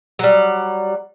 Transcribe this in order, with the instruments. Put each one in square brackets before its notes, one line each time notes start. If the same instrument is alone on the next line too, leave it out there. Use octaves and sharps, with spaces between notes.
[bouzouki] F#3 G3